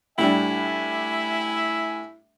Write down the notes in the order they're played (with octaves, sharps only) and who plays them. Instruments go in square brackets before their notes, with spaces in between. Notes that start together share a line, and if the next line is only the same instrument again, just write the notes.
[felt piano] A2 G3 D4 [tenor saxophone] E4 [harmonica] E5 G#5